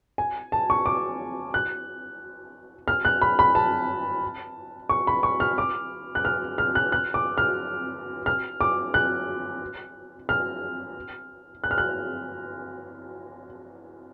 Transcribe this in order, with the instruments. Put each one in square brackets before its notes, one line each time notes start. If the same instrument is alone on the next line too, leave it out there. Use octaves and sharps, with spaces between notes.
[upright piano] G#5
A5
C#6
D6
F#6
F6
F#6
B5
B5
A5
C#6
B5
C#6
F6
D6
F#6
F6
F6
F#6
F#6
D6
F6
F6
D6
F#6
F6
F#6
F6
F#6